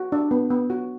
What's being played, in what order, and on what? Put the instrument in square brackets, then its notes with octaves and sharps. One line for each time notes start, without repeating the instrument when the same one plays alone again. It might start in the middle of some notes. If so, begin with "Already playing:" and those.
Already playing: [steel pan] F#4
D4
B3
B3
F#4